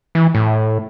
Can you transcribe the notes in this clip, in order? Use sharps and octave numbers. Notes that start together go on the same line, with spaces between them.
E3
A2